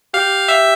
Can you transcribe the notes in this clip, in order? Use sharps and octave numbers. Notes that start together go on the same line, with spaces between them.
G4 F5
E5